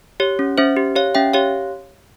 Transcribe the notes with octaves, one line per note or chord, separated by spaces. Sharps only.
G4 C#5
C#4
C#4 C5 E5
G4
G4 C#5 F5
C#4 E5 G5
G4 C#5 F5